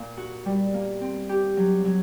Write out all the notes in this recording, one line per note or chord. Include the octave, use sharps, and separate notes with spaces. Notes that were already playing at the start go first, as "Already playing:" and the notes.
Already playing: A#2 A#3
F#4
G3
A#3
C4
G4
F#3
F#3